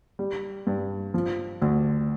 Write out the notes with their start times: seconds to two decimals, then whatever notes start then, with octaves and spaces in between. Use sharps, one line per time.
0.19 G3
0.67 G2
1.14 F3
1.62 D2